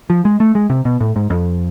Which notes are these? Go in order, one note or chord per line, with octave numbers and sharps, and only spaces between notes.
F3
G#3
A3
G#3
C3
B2
A2
G#2
F2